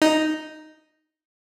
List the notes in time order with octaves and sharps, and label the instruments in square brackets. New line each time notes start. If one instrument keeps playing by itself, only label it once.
[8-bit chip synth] D#4